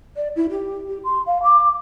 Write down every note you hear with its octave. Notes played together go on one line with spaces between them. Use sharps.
D5
E4
G4
G4
C6
F5
D6